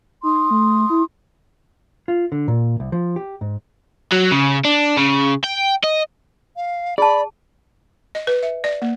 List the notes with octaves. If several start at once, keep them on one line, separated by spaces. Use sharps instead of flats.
D#4 C6 D#6
A3
E4
F4
D3
A#2
C2
F3
G4
G#2
F#3
C#3
D4
C#3
G5
D#5
F5
G#4 D5 A5 B5
D#5
B4
E5
D5
A#3